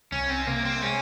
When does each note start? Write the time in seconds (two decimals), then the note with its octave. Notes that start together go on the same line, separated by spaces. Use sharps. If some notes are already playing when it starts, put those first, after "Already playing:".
0.12 C2 C#4
0.30 C4
0.47 C3 A#3
0.65 C4
0.82 G#3 C#4